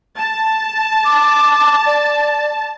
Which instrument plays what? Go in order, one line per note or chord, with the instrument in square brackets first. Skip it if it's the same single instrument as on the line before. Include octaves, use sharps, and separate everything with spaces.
[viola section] A5
[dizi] D6
D5